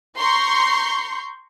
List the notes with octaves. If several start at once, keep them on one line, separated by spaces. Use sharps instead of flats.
A#5 C6 C#6 G6